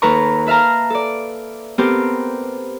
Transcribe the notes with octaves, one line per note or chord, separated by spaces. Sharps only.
D#2 A4 B4 A#5 C#6
B4 E5 F5 A5 A#5
A4 D5
B3 C4 G4 A4 A#4 C5